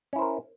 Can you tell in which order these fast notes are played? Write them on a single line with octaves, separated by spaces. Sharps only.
C#4 E4 C5 A#4